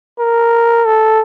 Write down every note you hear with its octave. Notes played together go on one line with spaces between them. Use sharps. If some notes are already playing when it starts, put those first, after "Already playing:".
A#4
A4